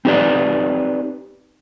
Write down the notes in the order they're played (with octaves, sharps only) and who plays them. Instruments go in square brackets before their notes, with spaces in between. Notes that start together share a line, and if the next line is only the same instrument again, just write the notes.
[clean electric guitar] C4 D#4 G4 B4 D5